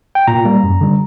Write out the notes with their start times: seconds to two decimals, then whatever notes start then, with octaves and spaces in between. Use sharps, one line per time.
0.15 G5
0.27 A#2 A#5
0.45 G3 A#3
0.63 F#2
0.81 D3 G3